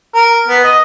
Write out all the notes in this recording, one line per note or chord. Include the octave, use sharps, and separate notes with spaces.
A#4
B3
D#5